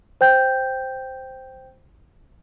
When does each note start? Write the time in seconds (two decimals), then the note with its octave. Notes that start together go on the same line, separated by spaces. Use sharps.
0.21 C5 G5 G6